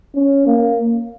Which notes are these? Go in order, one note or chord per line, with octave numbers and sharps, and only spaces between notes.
C#4
A#3